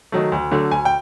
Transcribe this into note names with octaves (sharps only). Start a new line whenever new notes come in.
D#3 F#3 A3
D2
D3 F#3 A3
D2 G#5
G5